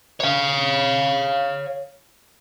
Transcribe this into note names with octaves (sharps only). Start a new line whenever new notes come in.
C#5 F5